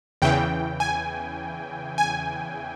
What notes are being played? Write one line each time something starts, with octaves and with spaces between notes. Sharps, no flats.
E2 C#3 E3 G5
G#5
G#5